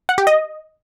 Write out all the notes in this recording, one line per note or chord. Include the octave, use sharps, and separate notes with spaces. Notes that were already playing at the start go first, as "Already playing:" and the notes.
F#5
G4
D#5